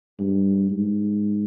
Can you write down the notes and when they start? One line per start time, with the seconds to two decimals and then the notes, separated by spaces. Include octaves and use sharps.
0.19 G2
0.71 G#2